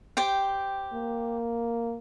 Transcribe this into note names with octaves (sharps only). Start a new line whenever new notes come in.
G4 C5 G5
A#3